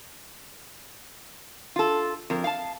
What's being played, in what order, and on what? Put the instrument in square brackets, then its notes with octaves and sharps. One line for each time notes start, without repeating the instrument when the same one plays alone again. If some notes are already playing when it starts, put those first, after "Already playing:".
[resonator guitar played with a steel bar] F4 A4
F2 A#4
F5 A5